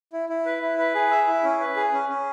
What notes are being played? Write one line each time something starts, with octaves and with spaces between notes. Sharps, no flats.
E4
E4
B4
E4
B4
G#4
E5
E4
C#4
B4
G#4
C#4
C#4